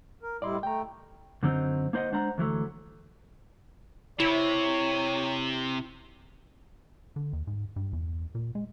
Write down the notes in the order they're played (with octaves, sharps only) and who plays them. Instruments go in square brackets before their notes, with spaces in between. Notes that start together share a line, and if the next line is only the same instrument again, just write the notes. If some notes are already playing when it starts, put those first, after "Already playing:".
[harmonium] A#4
[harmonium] A2 G3 E4 [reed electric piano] D5 D#5 C6
[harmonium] A3 [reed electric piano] G5 A#5
[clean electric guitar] F#2 D3 F#3 C4 D#4
A#3 D#4 C5 D5 D#5 F#5
G#3 D4 C5 F#5 A#5
D2 E3 F#3 A3
[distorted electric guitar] C3 [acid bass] E4 [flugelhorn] C#5
[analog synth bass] D3
D#2
G#2
G2
E2
A#2
G#3